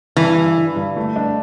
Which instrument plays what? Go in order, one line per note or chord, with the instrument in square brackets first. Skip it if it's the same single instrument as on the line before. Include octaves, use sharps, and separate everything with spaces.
[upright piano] G2 [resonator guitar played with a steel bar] E3
[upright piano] G2
D3
G2
A3
D4